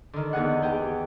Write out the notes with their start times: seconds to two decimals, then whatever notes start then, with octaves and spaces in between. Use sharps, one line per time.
0.13 D3 D#3
0.33 E2 D#4 G#4 F#5
0.62 G4 G#4 G5